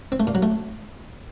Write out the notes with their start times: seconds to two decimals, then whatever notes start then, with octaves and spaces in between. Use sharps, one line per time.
0.12 C4
0.20 A3
0.27 A#2
0.35 F#3
0.43 A3